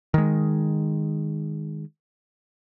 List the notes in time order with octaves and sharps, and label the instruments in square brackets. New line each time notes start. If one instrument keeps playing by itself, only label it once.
[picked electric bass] D#3 G#3